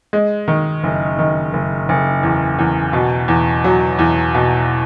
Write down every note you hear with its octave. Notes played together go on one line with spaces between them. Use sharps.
G#3
D#3
F#1
D#3
F#1
F#1
E2
E2
B2
E2
F#3
E2
B2